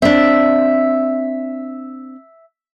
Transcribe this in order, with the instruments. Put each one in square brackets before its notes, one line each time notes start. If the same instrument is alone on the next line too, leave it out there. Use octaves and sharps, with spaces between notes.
[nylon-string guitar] C4 D4 [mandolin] E5